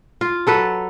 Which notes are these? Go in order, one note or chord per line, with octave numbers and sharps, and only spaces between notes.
F4
F#3 A4 B4